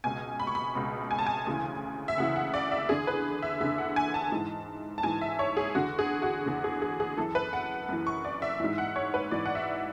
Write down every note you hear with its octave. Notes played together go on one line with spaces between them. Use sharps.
C#2 B2 G#5
B5
C#6
B5
C#2 B2 B5
G#5
A5
G#5
D2 C#3 E3
E5
D2 C#3 E3 F#5
F#5
D5
E5
E2 D3 G#4
B4
E5
E2 D3 E5
F#5
G#5
A5
G#2 E3
A5
G#2 E3 G#5
E5
C#5
G#4
E2 D3 F#4
G#4
F#4
E2 D3
G#4
G#4
G#4
F#2 E3 A4
B4
F#5
F#2 E3
C#6
D5
E5
G#2 E3 E5
F#5
C#5
B4
G#2 E3 D5
F#5
E5